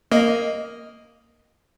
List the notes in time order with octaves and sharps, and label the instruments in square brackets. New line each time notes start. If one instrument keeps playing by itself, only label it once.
[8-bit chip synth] A#3 [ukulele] D#5